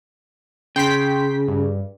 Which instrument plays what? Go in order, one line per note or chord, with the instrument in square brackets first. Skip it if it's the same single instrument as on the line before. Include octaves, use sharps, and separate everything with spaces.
[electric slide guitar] C#3 [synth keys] G5 C6 B6
[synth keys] G2